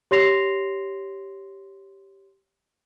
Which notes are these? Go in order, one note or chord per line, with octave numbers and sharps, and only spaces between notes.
G4 C#5 C6 A#6 C7 F7